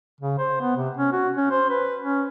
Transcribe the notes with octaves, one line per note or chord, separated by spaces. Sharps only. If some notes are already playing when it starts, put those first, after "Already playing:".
C#3
C5
B3
C3
C#4
F#4
C#4
C5
B4
C#4